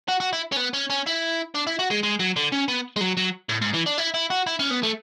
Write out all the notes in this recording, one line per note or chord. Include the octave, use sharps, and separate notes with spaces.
F#4
F#4
E4
C#4
B3
C#4
C#4
E4
D4
E4
F#4
G#3
G#3
F#3
D3
C#4
B3
G#3
F#3
F#3
A2
G#2
E3
D4
E4
E4
F#4
E4
C#4
B3
A3